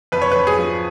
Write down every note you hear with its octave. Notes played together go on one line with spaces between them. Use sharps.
F2 B4
C#5
F2 B4
G#4
F3